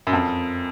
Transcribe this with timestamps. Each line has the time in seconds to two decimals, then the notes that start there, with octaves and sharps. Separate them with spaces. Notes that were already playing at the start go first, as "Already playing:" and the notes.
0.07 F#2
0.13 F2